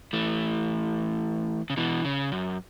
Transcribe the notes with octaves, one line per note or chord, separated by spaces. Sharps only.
E3 A3
C#3
B2 E3
C#3
F#2